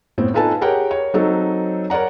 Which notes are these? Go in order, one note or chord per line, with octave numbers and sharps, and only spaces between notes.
A2 B3 C4
D#4 F4 A4 B4 G#5 A5
G4 G#4 A#4 C#5 F#5 G5
C#5
F#3 C4 D#4 A4
A#4 C#5 D5 F#5 A#5